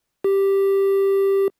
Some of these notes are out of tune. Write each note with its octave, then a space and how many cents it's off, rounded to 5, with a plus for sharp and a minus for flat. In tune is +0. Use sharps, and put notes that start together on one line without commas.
G4 +0